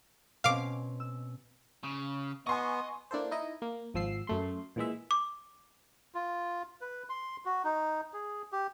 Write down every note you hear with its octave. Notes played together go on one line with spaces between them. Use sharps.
B2 C4 C#4 F5 D6
E6
C#3
B3 D#5 G#5 C6 C#6
A#3 D4 E4 A4 C5
D#4 E4 D#5
A#3
G#1 F3 E6 C7
F#2 A3 C6
A#2 E3 G#3 E5
D6
F4
B4
C6
F#4
D#4
G#4
G4